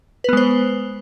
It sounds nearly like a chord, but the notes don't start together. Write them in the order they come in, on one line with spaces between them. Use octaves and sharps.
B4 B3 G#3 C5